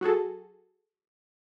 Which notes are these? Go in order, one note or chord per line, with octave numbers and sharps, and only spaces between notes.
F#3 F#4 G#4 A4